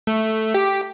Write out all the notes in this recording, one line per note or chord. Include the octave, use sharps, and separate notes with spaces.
A3
G4